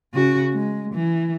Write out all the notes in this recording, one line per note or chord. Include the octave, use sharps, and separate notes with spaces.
C#3 F#4
G#3
E3